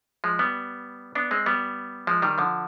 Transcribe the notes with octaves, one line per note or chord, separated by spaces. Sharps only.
F3 G#3
G3 B3
B3 D4
G#3 C4
G3 B3
F3 G#3
D#3 G3
D3 F3